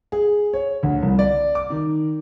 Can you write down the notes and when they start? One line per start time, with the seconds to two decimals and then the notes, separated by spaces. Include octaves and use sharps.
0.12 G#4
0.53 C#5
0.83 D2
1.03 C2
1.19 D5
1.55 D6
1.70 D#3